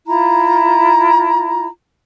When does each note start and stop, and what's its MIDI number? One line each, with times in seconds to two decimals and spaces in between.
0.06 1.66 64
0.06 1.66 65
0.06 1.66 82